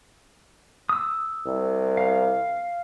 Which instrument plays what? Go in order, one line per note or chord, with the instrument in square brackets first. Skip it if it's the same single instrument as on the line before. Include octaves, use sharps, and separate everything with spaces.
[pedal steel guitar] D#6 E6
[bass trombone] C2
[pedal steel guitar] F5